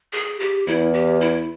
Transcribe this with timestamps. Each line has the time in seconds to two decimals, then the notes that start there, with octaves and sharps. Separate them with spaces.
0.13 G#4
0.40 G4
0.67 E2 E4
0.94 G4
1.21 E4